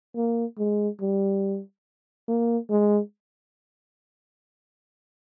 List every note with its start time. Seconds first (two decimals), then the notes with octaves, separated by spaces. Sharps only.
0.16 A#3
0.59 G#3
1.01 G3
2.28 A#3
2.70 G#3